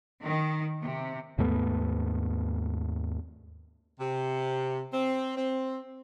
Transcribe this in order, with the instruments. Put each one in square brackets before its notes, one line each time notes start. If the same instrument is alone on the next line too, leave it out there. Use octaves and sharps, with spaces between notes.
[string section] D#3
C3
[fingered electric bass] D#2 G#2 A3 B3
[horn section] C3
C4
C4